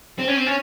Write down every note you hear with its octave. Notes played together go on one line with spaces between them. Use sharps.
C4
C#4
C4
C#4